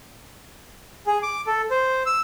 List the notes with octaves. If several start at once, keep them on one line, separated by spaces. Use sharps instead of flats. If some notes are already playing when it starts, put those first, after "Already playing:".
G#4
D6
A4
C5
E6